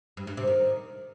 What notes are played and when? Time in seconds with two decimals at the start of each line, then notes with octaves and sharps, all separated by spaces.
0.17 G2
0.27 G2
0.37 C3
0.47 D#3